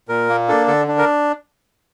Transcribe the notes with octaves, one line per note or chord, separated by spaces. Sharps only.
A#2 A#4
A#3
D4 A4
D3 A4
D4
A#4